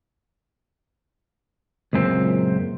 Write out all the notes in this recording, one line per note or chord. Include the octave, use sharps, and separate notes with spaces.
C#2 F#2 A#2 C4